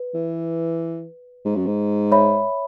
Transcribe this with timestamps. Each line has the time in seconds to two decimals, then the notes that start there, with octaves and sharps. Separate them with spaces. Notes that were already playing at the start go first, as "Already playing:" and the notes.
Already playing: B4
0.14 E3
1.45 G#2
1.56 F#2
1.66 G#2
2.11 C#5 E5 B5